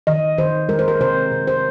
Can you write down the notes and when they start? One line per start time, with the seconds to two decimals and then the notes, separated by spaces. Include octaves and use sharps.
0.07 D#3 D#5
0.38 D#3 C5
0.69 G#3 A#4
0.79 C5
0.88 A#4
1.00 C3 C5
1.32 C3
1.47 C5